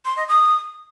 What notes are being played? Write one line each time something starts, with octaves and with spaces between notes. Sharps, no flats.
C6
D#5
D#6